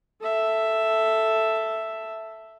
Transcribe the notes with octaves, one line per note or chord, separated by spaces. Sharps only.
A4 E5